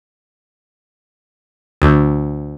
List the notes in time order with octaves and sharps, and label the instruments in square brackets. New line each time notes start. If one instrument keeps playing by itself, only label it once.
[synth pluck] D2